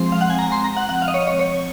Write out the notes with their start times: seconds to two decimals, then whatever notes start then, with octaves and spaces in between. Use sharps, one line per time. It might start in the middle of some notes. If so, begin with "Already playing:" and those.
Already playing: F3 G#3 C4 C6
0.12 F5
0.21 F#5
0.30 G#5
0.39 A#5
0.52 C6
0.64 A#5
0.77 F#5
0.89 F#5
1.02 F5
1.08 D#5
1.14 C#5
1.27 C#5
1.39 C#5